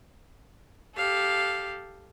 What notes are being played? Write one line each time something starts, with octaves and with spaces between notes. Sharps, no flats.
G4 A4 F5